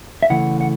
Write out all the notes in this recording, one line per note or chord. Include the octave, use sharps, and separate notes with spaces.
E5
C#3 E3 A3 F#5
F#5